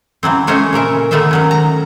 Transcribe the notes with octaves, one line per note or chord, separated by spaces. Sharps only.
C#3 E3 F#3 C4
G#3 A3 C#4 C5 C#5 D#5
A#2 C#3 A#4 E5
D3 D#3 A3 B3 C5 E5
D#3 F#3 C#4
A#5